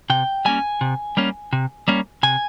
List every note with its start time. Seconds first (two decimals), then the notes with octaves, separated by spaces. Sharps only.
0.10 C3 G5
0.45 G3 A#3 C#4 G#5
0.81 C3
1.17 G3 A#3 C#4
1.53 C3
1.88 G3 A#3 C#4
2.23 C3 G#5